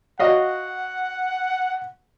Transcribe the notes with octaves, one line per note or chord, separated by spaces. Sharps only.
F#4 D#5 F5 F#5